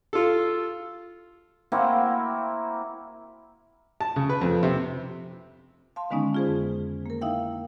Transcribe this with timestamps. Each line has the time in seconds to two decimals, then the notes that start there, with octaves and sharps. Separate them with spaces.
0.13 F4 A4
1.72 A#3 C4 E4 F#4
4.01 A5
4.16 C#3
4.29 B4
4.41 F2
4.63 C3
5.96 F5 A5 C6
6.10 D3 D#3 G#3 B3 C#4 D#4
6.34 F4 G#4 C5
6.47 F2
7.06 A#3 A#4
7.21 D#4 E4 E5 F5 G5